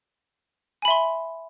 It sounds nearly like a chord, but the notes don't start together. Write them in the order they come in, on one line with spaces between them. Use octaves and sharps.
G#5 B5 E5 C6